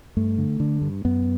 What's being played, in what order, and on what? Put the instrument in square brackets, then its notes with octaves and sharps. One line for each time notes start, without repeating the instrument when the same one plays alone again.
[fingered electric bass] G2 A3
D3
D3
G2
F#2 B3